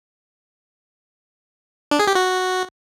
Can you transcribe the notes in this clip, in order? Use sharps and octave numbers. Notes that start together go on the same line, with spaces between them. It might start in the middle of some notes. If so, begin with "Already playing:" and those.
D4
G#4
G4
F#4